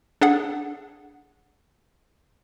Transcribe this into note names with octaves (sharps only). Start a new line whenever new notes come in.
D4 G#4 A4 F#5